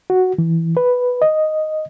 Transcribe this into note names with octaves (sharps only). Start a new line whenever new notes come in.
F#4
E3
B4
D#5